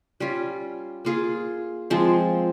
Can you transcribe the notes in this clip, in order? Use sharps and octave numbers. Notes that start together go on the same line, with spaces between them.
G3 C#4 F4
A#3 F4 G#4
F3 G#3 C4